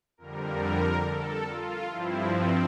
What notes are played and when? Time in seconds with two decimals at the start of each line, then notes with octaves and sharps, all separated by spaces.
0.18 F2 D3 G3 A#4
1.04 A4
1.47 F4
1.90 G2 F3 C4 E4
2.32 C4